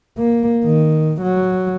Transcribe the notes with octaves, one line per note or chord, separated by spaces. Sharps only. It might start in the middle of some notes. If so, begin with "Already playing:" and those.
A#3
D#3
F#3